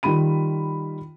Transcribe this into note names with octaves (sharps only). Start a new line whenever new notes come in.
D#3 G3 F4 B5 D#7